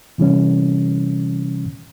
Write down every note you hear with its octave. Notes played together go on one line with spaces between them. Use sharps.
C3 E3 G3 C#4